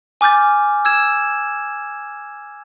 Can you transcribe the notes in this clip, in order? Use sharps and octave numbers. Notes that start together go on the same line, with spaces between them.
G#5 D6 F6 G6 A6
E6 G#6 E7